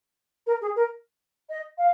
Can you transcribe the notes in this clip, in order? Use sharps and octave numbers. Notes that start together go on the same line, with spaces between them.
A#4
G#4
A#4
D#5
F5